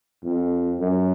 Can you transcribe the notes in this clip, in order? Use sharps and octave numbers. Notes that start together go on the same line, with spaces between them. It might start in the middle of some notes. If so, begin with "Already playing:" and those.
F2
F#2